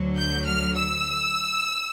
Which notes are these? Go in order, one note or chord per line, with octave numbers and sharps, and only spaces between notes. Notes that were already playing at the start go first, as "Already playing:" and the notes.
Already playing: D2 D3 F#3
G6
F6
E6